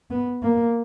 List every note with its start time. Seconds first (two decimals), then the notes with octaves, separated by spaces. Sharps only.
0.10 B3
0.42 A#3